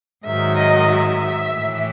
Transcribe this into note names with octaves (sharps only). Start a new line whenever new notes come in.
G#2 D#3 F#3 E5
D#5
E5
A2 E3